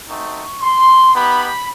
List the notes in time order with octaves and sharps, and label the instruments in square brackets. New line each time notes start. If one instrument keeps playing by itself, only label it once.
[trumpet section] A3 C4 D#4 F#4 C#6
C6
B3 D#4 G4 B5